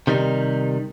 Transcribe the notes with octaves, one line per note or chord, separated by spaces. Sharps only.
C3 D#3 G3 D#4